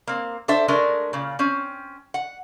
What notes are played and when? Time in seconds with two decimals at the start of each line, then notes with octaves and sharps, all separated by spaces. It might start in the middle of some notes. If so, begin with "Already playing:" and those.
0.07 A#3 C4
0.48 D4 A4 C5 E5
0.68 G#3 A3 D4 A#4
1.13 A#2 C#3
1.39 C4 C#4
2.14 F#5